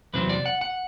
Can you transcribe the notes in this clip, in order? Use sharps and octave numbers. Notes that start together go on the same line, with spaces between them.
E2 C3 F#3 C4 B4
D5
F#5
F#5